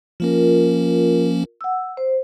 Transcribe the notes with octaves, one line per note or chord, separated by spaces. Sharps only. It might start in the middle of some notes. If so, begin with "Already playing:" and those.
F3 A#3 C#4 F4 A#4
F#5 E6
C5